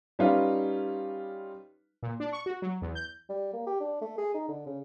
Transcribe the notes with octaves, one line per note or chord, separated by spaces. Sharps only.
G3 C#4 D#4 F4 B4
A#2
D4
C#6
F#4
F#3
E2
G6
G3
A#3
G4
D4
A3
G#4
D#4
D3
C#3